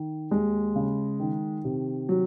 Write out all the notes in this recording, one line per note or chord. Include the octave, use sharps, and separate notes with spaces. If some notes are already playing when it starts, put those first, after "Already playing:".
Already playing: D#3
D#2 G#3
C#3
D#3
C3
F#3